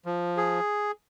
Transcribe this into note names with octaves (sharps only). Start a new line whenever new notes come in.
F3
G#4